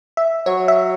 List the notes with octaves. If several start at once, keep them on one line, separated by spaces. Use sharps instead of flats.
E5
F#3 C#5
E5